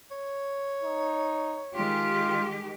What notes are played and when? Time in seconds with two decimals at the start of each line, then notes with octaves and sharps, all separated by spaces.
0.11 C#5
0.83 D#4
1.74 D#3 G#3 F4 G4